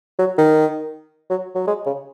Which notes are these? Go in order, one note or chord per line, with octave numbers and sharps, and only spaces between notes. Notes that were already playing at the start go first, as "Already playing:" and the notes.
F#3
D#3
F#3
F#3
G#3
C#3